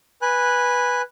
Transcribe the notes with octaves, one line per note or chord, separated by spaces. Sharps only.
B4 G#5 F#6